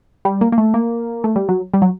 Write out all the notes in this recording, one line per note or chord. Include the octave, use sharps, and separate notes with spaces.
G3
A#3
A#3
A3
A#3
A3
G3
F#3
G3
F#3